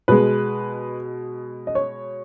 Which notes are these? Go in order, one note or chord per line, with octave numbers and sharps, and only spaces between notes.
B2 G#3 B4
D#5
C#5